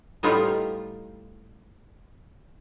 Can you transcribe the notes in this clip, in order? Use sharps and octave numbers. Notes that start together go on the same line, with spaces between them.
A2 G3 B3 D#4 F4 G4